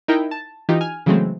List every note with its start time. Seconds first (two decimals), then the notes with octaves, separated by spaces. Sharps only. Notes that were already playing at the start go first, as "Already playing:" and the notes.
0.08 D#4 E4 A#4 G5
0.31 A5
0.69 E3 D#4 F4 G4
0.81 G#5 F6
1.06 C#3 E3 F#3 G#3 A3 C4